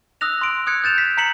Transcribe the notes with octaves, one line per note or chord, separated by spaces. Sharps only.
D#6 E6 F#6 A#6 F7
C6 D7
D#6 F#6 G#6 C#7
G6 A6 E7 F7
B6
A#5 B6 C#7 F#7